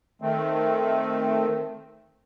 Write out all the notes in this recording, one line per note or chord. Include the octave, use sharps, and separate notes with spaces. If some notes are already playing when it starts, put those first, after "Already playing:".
D#3 A3 C4